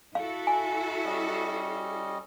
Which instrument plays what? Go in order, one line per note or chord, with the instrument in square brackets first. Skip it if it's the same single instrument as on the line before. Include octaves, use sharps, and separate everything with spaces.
[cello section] E4 F#4 A4 [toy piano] F5
[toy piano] G#5
[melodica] G3 C#4 D#5